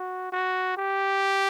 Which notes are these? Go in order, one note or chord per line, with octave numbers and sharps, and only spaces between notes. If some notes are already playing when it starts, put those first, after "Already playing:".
Already playing: F#4
F#4
G4